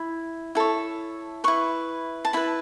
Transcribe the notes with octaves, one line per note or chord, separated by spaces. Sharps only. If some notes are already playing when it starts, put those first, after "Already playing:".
Already playing: E4 B5
E4 A4 C#5
E4 B4 C#6
A5
E4 B4 B5